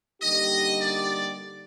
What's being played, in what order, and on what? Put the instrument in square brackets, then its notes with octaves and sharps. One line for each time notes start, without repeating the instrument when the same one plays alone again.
[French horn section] D3 G3 A#3 D#4 G4 [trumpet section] D#5
[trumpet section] D5